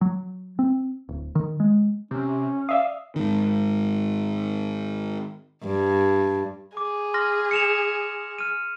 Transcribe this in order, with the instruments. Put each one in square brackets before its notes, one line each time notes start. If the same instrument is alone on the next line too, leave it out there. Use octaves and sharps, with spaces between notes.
[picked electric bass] F#3
C4
D1
D#3
G#3
[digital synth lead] C3 [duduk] C#4
[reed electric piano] D5 E5 D#6 [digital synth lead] F5
[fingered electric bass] G#2 D#3
[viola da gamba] G2
[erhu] G#4 [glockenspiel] D6
[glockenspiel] C6 F6 A#6
C#7 E7 F7
F6 D#7